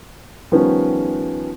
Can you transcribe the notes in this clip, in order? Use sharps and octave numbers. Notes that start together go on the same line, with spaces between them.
D#3 F3 G3 B3 C#4